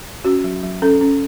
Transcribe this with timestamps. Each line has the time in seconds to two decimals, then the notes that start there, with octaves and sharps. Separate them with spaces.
0.24 C#4 F#4
0.44 F#3
0.63 F#3
0.82 C#4 A4
1.01 C#4